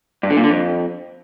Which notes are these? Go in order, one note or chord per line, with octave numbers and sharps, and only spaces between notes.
G2
D3
A#2
D3
F2